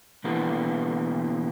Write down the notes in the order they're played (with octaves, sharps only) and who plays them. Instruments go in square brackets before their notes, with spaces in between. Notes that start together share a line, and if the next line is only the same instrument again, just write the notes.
[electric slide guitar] B2 D3 E3 G3 A#3 B3